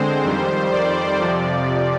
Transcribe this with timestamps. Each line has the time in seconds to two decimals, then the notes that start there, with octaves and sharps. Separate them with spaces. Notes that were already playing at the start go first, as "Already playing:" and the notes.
Already playing: D3 G#3 C4 C5
0.24 F2 D#3 G3
0.73 D5
1.21 F2 C3 F3